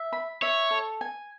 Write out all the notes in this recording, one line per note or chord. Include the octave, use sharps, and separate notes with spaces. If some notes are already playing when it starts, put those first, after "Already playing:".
Already playing: E5
B5
C#5 E5
A4
G#5